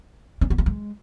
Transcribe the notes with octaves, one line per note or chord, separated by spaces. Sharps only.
C#4
B3
A3
G#3